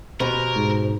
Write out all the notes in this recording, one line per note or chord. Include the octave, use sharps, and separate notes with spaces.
B2 G4 A#4 C5
G#2